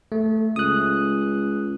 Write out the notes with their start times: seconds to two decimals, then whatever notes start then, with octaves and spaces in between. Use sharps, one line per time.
0.12 A3
0.56 C#2 D#6 F#6